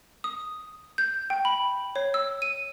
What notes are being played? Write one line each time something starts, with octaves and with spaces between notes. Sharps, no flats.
D#6
G6
G5
B5
C#5
E6
D#7